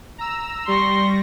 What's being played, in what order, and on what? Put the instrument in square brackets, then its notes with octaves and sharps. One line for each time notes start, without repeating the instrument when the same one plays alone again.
[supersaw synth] A#5 E6
[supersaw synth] G3 C#6 A#6 [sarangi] C6